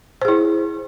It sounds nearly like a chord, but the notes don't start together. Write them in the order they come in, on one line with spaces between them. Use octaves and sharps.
C5 G#4 E4